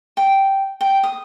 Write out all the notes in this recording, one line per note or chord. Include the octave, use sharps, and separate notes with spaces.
G5
G5
D#6